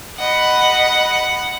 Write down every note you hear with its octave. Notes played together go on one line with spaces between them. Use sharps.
D#5 F#5 B5